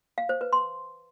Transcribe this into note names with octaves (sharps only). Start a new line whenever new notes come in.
F5
C5
B4
C6